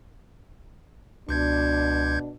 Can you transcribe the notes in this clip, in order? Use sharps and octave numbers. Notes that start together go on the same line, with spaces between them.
C#2 B2 D4 G6 G#6